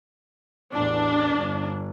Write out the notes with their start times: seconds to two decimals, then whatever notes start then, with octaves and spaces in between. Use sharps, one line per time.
0.73 A1 E2 D4
1.34 G1